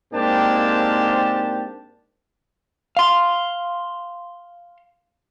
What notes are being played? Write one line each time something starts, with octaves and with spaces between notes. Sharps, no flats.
G#2 A#3 C4 D4 G4 A5
F5 C6